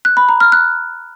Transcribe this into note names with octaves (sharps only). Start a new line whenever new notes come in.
F#6
B5
A#5
F6
F#6